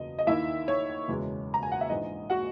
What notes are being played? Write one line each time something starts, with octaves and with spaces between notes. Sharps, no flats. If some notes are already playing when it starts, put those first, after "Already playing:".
Already playing: F#1 E2 B2 D#5
D#5
D#2 D#3 A#3 E4 E5
C#5
F#1 E2 B2 G#3
A#5
G#5
F#5
E5
A#1 G#2 E3 D#5
F#4 F#5